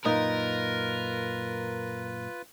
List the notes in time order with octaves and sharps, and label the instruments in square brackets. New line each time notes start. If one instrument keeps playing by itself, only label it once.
[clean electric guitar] F#2 A#2 [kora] D#4 [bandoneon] F4 B4 [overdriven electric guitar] A#4